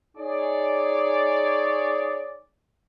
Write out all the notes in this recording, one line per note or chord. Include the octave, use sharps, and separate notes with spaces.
D#4 G#4 C#5 D5